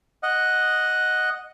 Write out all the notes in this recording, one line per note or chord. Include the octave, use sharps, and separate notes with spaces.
D#5 F#5